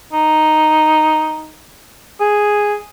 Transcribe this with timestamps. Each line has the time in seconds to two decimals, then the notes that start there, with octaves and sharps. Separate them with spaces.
0.13 D#4
2.20 G#4